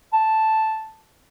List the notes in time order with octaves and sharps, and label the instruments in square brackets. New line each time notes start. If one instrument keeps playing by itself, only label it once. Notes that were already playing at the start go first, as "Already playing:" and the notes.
[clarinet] A5